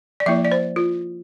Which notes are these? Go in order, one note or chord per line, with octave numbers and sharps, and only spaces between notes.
D5
F3 A#3 E4 E5
D5
C5
F4